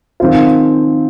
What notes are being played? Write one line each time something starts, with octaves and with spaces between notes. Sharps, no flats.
D#3 C4 F4